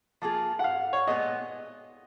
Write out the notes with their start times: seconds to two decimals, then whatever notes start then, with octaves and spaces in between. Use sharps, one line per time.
0.22 F3 A#3 F4 G#4
0.59 F#5
0.64 F5
0.93 C#5
1.07 A#2 G#3 B3 D#5